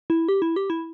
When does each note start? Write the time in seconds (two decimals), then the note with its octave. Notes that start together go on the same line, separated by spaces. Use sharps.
0.10 E4
0.29 G4
0.42 E4
0.56 G4
0.70 E4